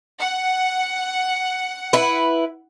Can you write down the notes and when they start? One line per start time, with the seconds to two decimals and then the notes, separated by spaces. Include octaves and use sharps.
0.20 F#5
1.93 E4 B4